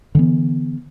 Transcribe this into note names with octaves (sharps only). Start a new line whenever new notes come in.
D3 E3 B3